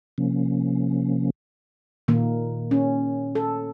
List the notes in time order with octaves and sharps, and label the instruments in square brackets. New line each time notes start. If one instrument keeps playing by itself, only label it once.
[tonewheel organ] C3 F3 A#3 C#4
[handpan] A#2 D#3 A#3
C#4
A4